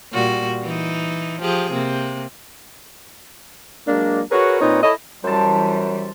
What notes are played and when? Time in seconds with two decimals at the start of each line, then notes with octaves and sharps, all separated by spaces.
0.12 A#2 G3 F#4
0.62 E3 D#4
1.41 F3 G4 G#4
1.72 C3 A#3
3.88 F#3 G#3 A#3 D4
4.31 F#4 G#4 A#4 B4 C#5
4.60 A#2 C4 D#4 B4 C#5
4.83 E4 A4 C#5 D#5
5.24 F#2 E3 G3 C5 A5